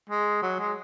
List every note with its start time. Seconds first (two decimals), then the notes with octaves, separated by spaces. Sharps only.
0.10 G#3
0.42 F#3
0.59 G#3